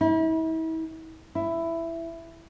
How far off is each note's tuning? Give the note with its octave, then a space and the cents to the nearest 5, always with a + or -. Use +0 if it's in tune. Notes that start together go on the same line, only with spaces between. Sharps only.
E4 -40
E4 +10